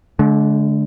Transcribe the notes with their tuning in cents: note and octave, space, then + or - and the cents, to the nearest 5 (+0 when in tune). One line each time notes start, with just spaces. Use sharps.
D3 -15 G#3 +45